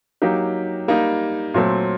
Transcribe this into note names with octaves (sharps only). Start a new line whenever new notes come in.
F#3 A#3 D#4 G4
G3 A#3 D#4
A#2 F#3 A3 C4